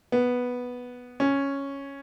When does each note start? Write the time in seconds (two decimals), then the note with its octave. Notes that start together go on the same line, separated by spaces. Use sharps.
0.12 B3
1.20 C#4